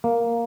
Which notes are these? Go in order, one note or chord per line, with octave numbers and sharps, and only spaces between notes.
A#3